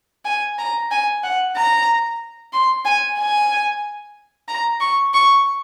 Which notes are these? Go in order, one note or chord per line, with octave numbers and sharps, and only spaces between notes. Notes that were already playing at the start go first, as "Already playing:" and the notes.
G#5
A#5
G#5
F#5
A#5
C6
G#5
G#5
A#5
C#6
C#6